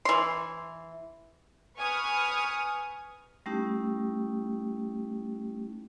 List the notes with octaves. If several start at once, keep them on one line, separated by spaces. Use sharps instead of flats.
E3 C6
B4 G#5 C#6 D#6 F6
G3 A3 C#4 D#4 E4 G4